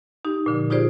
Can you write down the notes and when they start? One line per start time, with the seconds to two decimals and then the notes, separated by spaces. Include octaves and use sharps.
0.25 D#4 G4
0.46 A#2 D3 F3
0.70 D#4 F4 G4 G#4 C5 D5